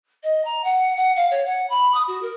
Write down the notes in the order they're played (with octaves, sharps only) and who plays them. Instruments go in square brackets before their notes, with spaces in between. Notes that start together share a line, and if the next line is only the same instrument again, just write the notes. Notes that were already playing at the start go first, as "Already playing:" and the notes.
[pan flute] D#5
A#5
F#5
F#5
F5
C#5
F#5
B5
D#6
F#4
A#4